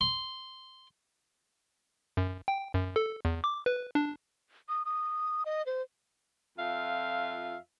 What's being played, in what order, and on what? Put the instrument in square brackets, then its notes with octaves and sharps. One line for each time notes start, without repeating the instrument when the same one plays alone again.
[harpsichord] C6
[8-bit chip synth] F#2
G5
F#2
A4
E2
D6
B4
D4
[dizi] D#6
D#6
D#5
C5
[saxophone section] F2 F4 E5 F5